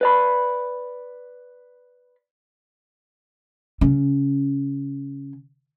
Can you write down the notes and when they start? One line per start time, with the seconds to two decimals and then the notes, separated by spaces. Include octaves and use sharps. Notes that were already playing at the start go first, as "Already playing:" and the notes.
0.01 B4 D5 B5
3.81 C#3 C#4